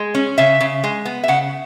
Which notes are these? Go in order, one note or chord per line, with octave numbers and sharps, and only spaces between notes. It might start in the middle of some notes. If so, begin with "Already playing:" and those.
Already playing: G#3
C#4
C#3 E5
C#3
G#3
B3
E5
C#3 F#5